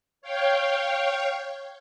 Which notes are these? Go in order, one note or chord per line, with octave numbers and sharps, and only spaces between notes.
C#5 F5 G5